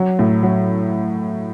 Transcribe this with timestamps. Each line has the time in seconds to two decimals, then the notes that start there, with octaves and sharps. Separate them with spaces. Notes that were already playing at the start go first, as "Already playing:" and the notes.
Already playing: F#3
0.19 A2
0.43 F#3